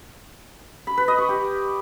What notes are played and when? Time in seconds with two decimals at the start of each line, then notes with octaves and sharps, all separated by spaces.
0.87 B5
0.97 B4
1.08 D#5
1.18 C#6
1.29 G4